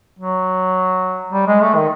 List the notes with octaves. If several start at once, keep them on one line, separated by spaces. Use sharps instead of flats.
F#3
G3
G#3
A3
D#3